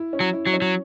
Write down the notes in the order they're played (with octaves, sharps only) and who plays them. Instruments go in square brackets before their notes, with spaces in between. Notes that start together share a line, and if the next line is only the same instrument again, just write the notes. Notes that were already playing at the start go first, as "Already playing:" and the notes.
Already playing: [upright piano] E4
C#4
[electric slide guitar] F#3
[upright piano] E4
[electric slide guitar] F#3
[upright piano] C#4
[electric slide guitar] F#3